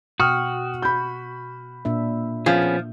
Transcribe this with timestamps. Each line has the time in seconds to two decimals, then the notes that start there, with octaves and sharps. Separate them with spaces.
0.20 B2 F#4 G5 D#6 F6
0.82 B5 G6
1.85 A#2 D4 E5
2.46 F3 B3 C#4 G#4